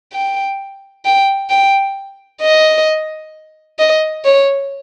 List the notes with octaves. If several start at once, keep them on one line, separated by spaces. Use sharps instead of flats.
G5
G5
G5
D#5
D#5
C#5